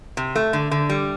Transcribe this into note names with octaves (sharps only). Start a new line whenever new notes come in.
C3
A3
D3
D3
G3